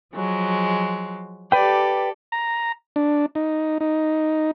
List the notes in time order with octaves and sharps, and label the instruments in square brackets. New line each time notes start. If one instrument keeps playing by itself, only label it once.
[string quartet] F3 F#3 G#3
[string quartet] G4 A4 D5 [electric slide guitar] B4 G5
[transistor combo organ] A#5
D4
D#4
D#4